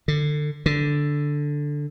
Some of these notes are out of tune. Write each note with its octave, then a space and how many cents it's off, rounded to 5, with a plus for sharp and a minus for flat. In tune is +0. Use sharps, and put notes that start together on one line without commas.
D3 +25
D3 +0